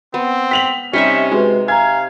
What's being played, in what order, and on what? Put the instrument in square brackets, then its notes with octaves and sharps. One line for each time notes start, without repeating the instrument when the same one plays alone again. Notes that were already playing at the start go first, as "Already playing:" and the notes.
[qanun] B3 [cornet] C4
[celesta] G5 [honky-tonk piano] B6 F7 F#7
[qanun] C3 D#4 E5 [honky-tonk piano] G3 [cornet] C#4 [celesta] F6 B6 C#7
[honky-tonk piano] G#3 [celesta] F#4 G#4 B4
[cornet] F5 [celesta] G#5 A#5 [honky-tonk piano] G#6